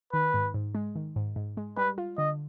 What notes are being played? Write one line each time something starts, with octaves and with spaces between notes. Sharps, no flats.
D#3 B4
G#2
G#2
G#3
D#3
G#2
G#2
G#3
G3 B4
F4
D3 D#5